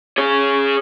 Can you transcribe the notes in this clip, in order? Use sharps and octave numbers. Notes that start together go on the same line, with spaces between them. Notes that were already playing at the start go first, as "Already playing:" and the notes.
G#4 C#5